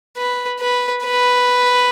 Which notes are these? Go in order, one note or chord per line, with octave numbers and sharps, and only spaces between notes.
B4
B4
B4